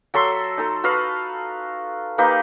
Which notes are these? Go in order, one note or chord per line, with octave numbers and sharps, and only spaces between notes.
F#3 A4 E5 C6
D#4 A4
F#4 B4 D#5 F5
A#3 D#4 G4 B4